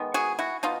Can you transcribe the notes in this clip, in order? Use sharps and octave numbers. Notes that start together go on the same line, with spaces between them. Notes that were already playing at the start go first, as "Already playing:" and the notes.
Already playing: D#3 G#3 B3
F#4 G#4
E4 F#4
B2 D#4 F4